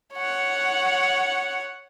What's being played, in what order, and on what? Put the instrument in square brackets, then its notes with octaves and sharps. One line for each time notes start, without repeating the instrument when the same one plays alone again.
[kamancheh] C#5 F#5